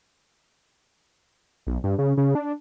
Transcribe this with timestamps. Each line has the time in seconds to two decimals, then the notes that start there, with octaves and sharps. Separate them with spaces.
1.67 B1
1.84 G2
1.98 C#3
2.17 C#3
2.35 D4